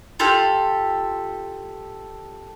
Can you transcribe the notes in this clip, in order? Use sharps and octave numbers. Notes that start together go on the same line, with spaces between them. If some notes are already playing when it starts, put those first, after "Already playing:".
F4 G4 A4